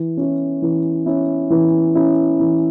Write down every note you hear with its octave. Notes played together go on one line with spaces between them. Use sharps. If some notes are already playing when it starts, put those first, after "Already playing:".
Already playing: E3
C#4 E4
E3
C#4 E4
E3
C#4 E4
E3